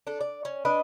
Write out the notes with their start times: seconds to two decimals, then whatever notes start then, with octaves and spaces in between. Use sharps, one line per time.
0.07 D4 A4
0.21 D5
0.45 C#4
0.65 D4 B4 D#5